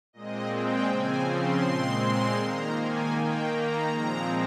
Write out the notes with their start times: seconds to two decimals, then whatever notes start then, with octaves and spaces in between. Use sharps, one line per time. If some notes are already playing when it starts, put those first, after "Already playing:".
0.13 A#2 G#3 C4 D#5
0.51 G5
0.88 C#3 F3 C4 G#5
1.26 C6
1.64 A#2 G#3 C4
2.01 C6
2.39 D#3 A#3 A#5
2.77 G#5
3.14 D#3 A#3 G5
3.52 A#5
3.89 A#2 F3 G#3 C4 A#5